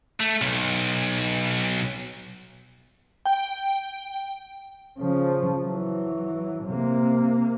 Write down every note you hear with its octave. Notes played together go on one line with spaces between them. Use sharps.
A3
B1
G5
C#3 F3
E3 F#3
C3 A#3